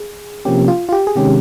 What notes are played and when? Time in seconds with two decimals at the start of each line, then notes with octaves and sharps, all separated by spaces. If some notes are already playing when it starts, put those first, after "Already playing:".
Already playing: G#4
0.45 C3 F3 A#3 C#4 G4
0.68 F4
0.89 F4
0.92 G4
1.07 G#4
1.16 C3 D#3 G#3 C#4 G4